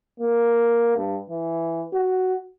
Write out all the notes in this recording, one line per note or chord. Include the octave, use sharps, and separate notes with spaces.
A#3
G2
E3
F#4